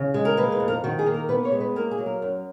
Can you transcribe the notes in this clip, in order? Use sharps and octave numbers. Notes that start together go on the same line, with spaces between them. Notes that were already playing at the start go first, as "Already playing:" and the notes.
Already playing: C#3
G#3
A#4
A#3 B4
B4
F2
A#4
D#3 F#4
G#4
A#3
A#4
B3 B4
C#5
G#3
B4
A#3 A#4
G#4
F#3
A#4
F#2